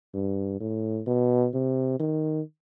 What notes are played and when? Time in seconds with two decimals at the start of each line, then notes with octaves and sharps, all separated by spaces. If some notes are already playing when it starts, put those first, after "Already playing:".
0.14 G2
0.60 A2
1.07 B2
1.54 C3
1.99 D#3